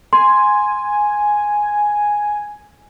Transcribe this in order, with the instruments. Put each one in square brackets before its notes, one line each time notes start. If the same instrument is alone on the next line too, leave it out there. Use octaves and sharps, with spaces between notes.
[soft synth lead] G#5 [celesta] C6